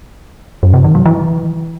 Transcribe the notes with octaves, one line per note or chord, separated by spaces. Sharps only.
F#2
C3
D#3
F#3
E3